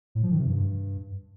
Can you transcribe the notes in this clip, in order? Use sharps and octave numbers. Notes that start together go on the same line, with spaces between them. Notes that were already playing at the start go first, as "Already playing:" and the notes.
A2
F3
D#3
C3
G2